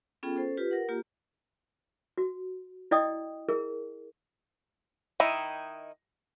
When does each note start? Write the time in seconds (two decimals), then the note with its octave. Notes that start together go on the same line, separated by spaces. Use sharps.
0.23 B3 C#4 F4 G#4 A4 G5
0.36 C#4 A4 C5
0.57 F4 G4 B4
0.71 A#4 F#5
0.88 A#3 F4 G4
2.17 F#4
2.91 E4 D5 D#5 G5 D#6
3.49 E4 G#4 A#4
5.20 D#3 D#4 E4